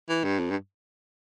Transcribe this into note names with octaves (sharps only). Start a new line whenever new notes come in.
E3
G2
F2
G2